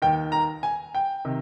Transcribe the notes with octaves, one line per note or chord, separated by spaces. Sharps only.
D#2 D#3 G5
A#5
G#5
G5
C3 D#3